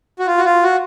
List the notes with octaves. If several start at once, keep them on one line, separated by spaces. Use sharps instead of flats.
F#4
F4
F#4
F4
F#4